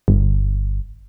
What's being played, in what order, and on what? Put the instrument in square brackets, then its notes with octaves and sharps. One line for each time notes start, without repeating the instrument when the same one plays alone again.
[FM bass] G1